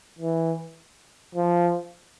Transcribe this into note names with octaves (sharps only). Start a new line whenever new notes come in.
E3
F3